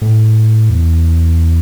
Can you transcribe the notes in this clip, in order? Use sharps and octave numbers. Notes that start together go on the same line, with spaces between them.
A2
E2